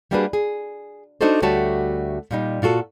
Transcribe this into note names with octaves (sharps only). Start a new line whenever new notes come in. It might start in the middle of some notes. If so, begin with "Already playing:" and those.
G3 A#3 D4 F#4 G#4 B4
G#4
D4 D#4 F#4 A4 C5
D2 G3 A3 F#4 C#5 A5
A#2 G3 D#4
A#2 F4 F#4 A4